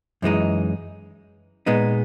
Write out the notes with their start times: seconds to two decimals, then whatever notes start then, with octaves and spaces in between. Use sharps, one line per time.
0.22 F#2 E3 G#3 D#4
1.66 A#2 G#3 B3 D#4